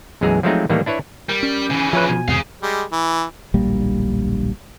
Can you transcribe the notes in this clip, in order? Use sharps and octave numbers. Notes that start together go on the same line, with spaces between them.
B1 F#2 E3 G#3 G#4 A#5
F3 F#3 G#3 A3 C4 D#4
A2 D#3 E3 G3 A#3
D4 E4 B4 C#5
G3 A#4
C#4
C#3 E3
F3 B4 C#5 E5
B2 G#5
E2 G#2 C3 G#4 F5
G3 G#3
E3
D1 A#1 G3 A#3